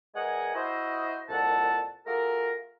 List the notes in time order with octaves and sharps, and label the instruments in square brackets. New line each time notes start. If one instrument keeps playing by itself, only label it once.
[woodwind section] E2 G#3 A#4 D#5 F#5 G#5
E4 F#4 C5 D#5
C2 F2 A#2 A4 F#5 A5
A3 F4 F#4 G#4 A#4